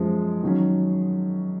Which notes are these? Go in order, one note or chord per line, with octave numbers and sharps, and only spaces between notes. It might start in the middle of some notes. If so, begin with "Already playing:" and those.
Already playing: F#2 F3 G#3
D#3 F#3 C#4